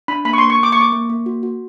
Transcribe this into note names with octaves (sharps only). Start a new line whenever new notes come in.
D4 B5
A#3 B5
C#6
C6
A#3
C#6
A#3 D6
A#3 C#6
D6
A#3
A#3
F#4
F#4